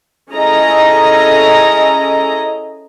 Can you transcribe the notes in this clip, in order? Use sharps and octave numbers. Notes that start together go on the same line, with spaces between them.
C#4 E4 G#4 A4 D#5 A#5